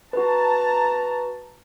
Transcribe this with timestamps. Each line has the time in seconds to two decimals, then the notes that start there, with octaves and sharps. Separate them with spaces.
0.13 F#4 B4 A5 A#5